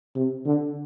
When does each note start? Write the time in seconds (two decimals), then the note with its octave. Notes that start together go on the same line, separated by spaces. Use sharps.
0.15 C3
0.46 D3